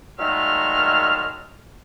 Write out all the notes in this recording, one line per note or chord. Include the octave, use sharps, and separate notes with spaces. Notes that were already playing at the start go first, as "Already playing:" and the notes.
A#2 D#3 F#3 G#3 A3 F6